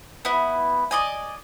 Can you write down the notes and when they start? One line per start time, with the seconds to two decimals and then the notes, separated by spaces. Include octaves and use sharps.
0.25 B3 E4
0.91 D5 D#5 G#5